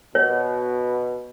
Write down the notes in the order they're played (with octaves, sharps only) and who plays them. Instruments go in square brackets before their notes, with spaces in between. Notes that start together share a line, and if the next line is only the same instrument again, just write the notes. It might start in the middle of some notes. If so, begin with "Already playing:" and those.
[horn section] B2 [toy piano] C#5